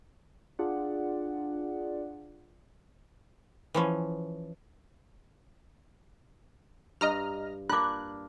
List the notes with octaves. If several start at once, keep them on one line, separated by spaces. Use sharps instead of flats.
D4 F4 G#4 D5 F#5
E3 F3 C#4
G2 D#5 A#5 F6
A#3 D4 F4 D6 F#6